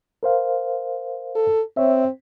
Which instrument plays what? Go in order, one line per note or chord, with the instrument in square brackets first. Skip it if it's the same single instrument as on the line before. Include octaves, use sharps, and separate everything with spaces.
[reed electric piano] A#4 C5 F5
[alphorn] A4
[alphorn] C4 [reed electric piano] C#5 E5